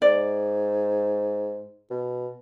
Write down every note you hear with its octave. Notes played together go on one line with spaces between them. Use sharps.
G#2 D5
B2